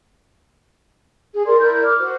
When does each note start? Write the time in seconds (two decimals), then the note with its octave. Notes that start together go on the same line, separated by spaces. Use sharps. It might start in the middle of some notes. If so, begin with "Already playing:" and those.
1.34 G#4
1.46 A#4 D5 C6
1.60 E4 A#4 D5 G6
1.84 D6 F6
2.00 F#4 C5